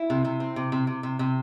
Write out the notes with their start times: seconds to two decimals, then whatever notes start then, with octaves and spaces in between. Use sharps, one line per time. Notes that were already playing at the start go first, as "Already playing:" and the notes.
Already playing: E4
0.10 C3
0.25 C3
0.40 C4
0.56 C3
0.72 C3
0.87 C3
1.03 C3
1.19 C3